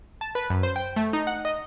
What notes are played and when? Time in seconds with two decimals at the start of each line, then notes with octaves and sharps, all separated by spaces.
0.21 A5
0.35 B4
0.50 F#2
0.63 C5
0.76 G5
0.96 A3
1.13 D#4
1.27 F#5
1.45 D#5